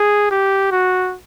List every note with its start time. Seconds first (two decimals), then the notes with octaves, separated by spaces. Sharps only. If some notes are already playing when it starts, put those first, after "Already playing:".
Already playing: G#4
0.31 G4
0.72 F#4